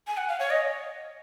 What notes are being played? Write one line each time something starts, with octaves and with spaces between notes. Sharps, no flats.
G#5
F#5
F5
C#5
D#5